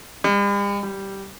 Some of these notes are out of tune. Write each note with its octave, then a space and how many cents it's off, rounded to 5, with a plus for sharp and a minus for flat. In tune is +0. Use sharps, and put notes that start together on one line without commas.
G3 +45
G3 -5